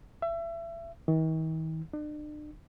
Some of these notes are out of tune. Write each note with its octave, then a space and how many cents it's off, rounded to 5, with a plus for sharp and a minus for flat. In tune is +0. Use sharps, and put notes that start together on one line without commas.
E5 +30
D#3 +45
D4 +40